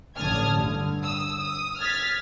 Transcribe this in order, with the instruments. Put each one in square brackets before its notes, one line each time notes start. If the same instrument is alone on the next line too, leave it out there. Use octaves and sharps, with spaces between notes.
[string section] A1 D3 A5 D#6 F6 G#6
G2 D3
D#6 E6
D#6
F6 G#6 A6 B6